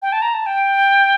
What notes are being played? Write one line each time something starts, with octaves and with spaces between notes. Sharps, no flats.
G5
A5
A#5
A5
G5